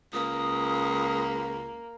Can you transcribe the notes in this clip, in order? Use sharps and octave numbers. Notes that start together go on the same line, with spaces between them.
C#2 A#3 D#6